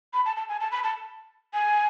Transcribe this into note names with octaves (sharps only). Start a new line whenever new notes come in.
B5
A5
A5
G#5
A5
B5
A5
G#5